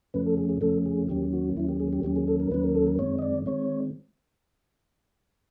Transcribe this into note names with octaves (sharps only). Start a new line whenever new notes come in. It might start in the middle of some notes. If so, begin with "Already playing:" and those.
F2 C#3 F3 A3 C#4 B4
A4
G#4
G#4
F2 C#3 F3 A3 C#4 A4
G#4
D#2 D#3 F#3 A#3 C#4 G4
F#4
D#2 D#3 F#3 A#3 C#4 E4
G4
G#4
G4
D#2 D#3 F#3 A#3 C#4 G4
G#4
A4
A#4
D#2 D#3 F#3 A#3 C#4 B4
A#4
A4
A#4
F#2 D#3 G#3 C4 C#5
D#5
D5
D#3 G#3 C4 C#5